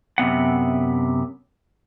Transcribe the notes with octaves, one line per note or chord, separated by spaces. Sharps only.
F#2 C3 B3 F#5